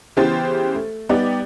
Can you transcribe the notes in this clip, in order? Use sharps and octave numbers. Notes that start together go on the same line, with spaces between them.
C#3 E3 B3 G4 C5 A6
A3
G3 B3 D#4 G4 D5